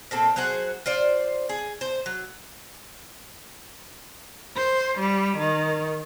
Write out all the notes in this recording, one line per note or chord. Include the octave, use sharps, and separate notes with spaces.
A#2 C4 A4
F#3 G#4 C5 F#5
F4 C5 D5
G#4
C5
F#3
C5
G3
D#3